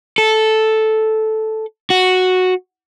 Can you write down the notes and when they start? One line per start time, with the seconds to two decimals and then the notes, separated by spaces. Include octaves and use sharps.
0.18 A4
1.90 F#4